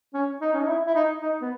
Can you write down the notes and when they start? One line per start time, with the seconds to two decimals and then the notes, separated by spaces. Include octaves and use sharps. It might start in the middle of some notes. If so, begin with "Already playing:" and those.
0.14 C#4
0.41 D#4
0.53 C#4
0.60 D#4
0.68 E4
0.86 E4
0.95 D#4
1.22 D#4
1.42 B3